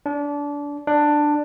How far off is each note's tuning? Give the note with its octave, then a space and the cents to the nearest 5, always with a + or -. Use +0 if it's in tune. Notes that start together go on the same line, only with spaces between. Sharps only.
D4 -25
D4 +10